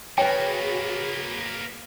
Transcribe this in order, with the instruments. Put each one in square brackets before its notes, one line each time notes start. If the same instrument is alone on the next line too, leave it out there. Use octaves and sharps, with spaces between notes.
[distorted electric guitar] A#3 B3 [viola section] F#4 G#4 [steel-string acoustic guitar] B4 C#5 [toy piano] G5